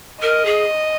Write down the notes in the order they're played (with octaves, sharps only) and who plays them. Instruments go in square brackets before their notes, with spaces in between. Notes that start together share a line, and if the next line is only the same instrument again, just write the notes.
[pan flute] A#4 [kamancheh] D#5
[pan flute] G#4